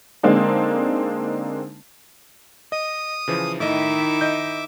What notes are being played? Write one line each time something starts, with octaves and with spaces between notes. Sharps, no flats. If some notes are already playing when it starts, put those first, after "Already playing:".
D3 G#3 A#3 C4 D4 D#4
D#5 D#6
C#3 E3 F3
A2 D#3 E4 D#5 E5 D6
D#5 G6